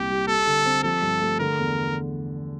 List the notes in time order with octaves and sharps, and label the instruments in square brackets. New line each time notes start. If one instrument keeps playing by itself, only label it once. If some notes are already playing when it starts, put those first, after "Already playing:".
Already playing: [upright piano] C2 A#2 [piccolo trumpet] G4
[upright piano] G3
[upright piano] G3 [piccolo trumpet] A4
[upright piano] D3
C4
[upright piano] F3 [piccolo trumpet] A4
[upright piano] G2
A3
[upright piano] D3 [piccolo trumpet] A#4
[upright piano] E2